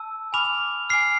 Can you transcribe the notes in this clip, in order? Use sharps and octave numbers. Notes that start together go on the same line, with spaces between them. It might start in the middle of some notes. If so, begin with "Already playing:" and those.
Already playing: A5 E6
G#5 B5 D6 F6 F7
G#5 D6 F6 C7